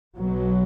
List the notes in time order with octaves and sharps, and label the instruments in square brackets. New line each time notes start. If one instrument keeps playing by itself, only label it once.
[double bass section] B1 B2 F#3